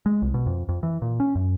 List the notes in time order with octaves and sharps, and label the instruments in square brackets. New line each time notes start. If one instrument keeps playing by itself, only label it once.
[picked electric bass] G#3
C2
B2
F2
F2
E3
A#2
C#4
F#2